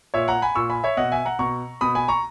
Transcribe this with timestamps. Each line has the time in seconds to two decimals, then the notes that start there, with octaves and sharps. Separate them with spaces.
0.14 A#2 C#5 E5
0.28 F#5 A#5
0.42 G#5 B5
0.55 A#2 C#6 E6
0.70 G#5 B5
0.84 C#5 E5
0.97 B2 D#5 F#5
1.12 E5 G#5
1.25 F#5 A#5
1.39 B2 A#5 C#6
1.81 B2 B5 D#6
1.95 G#5 B5
2.08 A#5 C#6